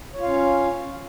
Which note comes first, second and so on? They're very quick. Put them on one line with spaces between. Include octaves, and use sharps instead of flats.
C#5 F4 F5 C#4